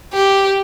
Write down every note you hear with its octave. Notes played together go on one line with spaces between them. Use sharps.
G4